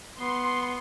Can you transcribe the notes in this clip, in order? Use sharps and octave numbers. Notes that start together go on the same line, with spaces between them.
B3 C6